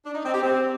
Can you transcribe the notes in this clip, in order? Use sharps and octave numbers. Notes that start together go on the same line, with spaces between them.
D4
D#4
C4
G4
C4